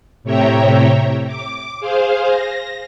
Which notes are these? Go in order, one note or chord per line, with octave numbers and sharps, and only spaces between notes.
A2 C3 C#5 E5 G5 A#5
D6
G#4 C5 F5
A#6